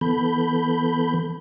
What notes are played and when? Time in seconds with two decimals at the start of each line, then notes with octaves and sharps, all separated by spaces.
0.01 E3 B3 A4 B5 G6